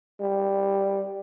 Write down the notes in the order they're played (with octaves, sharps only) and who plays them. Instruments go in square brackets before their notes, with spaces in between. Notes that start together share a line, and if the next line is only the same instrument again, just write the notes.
[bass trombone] G3